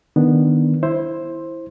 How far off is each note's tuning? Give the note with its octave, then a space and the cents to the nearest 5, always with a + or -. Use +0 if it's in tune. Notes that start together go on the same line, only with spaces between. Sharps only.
D#3 +0 B3 -5 D4 +0
E4 +0 C5 +10